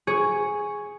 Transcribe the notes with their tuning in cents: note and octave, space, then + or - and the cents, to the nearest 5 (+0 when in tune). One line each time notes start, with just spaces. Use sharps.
G#4 +0 C#5 +0